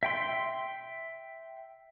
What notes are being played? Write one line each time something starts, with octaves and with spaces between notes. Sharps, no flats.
E5 G5 C6